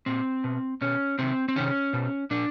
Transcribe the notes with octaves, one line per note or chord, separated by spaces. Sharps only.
A#2 C4
B2
B2 C#4
C3 D#3 C4
C4
C3 D#3 C#4
B2
A#2 D4